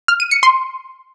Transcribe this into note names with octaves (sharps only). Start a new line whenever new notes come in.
F6
D#7
C#7
C6